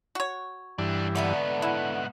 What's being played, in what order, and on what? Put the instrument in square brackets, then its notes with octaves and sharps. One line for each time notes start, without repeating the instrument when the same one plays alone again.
[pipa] F#4 C#5
[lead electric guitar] D2 D4 [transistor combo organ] G2 E3
[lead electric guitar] G#2 B3 [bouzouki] D3 A3 B4
[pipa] E4 [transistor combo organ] F#5